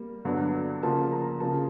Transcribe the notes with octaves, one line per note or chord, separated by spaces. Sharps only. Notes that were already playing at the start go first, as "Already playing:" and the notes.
Already playing: G3 A#3
G2 D3 F#3 B3
C#3 F3 A#3 A5
A#5
C#3 F3 A#3 A5